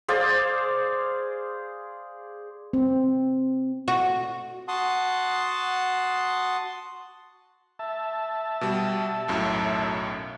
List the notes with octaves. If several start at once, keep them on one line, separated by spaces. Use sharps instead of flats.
G#4 C5 D5 F5
C4
F#4
F#4 F#5 A5 C6 D#6
E5 A5
B2 G3
B1 F#2 A2